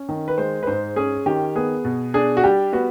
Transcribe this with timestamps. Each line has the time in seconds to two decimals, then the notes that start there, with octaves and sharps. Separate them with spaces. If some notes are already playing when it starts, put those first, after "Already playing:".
Already playing: C#4
0.09 D#3
0.28 B4
0.38 G#3 C5
0.63 B4
0.67 G#2 C5
0.96 C#4 G#4
1.26 D#3 G4
1.56 B3 G#4
1.85 B2
2.14 D4 G#4
2.37 F#4
2.44 G3 G4
2.73 B3 F#4